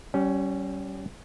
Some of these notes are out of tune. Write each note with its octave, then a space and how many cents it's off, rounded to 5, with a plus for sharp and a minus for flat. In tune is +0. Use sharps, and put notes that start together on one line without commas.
G3 -30 C#4 +0